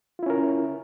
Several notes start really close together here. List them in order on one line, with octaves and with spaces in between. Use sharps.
F4 E4 C#4 A#4